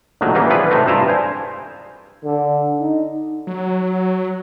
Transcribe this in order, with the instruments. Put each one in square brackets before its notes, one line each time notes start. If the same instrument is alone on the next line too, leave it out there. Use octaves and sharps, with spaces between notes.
[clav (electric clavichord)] A#1 A2 D#3 F#3
C#3 E3 G3 A#3 B3
F3 B3 E4 F4 G#4 B4
A2 C3 G#3 A3 D#4
G2 E4 F4 C5 E5 A#5
C5 G#5
[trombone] D3
D#4
[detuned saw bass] F#3